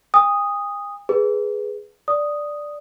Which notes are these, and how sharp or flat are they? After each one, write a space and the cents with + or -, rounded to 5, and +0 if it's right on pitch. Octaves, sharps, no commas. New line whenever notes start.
G#5 -45 D#6 +0
G#4 +0 B4 +0
D5 +0 D#6 +0